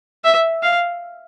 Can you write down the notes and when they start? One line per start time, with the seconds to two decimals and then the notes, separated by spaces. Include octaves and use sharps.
0.24 E5
0.63 F5